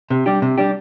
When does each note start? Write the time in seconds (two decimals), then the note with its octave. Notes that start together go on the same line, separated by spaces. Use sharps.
0.10 C3
0.26 G3 D4 G4
0.42 C3
0.58 G3 D4 G4